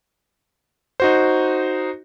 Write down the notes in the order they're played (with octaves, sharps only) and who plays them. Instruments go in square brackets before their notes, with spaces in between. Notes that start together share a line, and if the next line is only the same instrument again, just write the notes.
[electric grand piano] D#4 F#4 C5